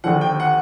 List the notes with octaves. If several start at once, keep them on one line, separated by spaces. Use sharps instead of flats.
D#2 D3 F3 F#5
G5
F#5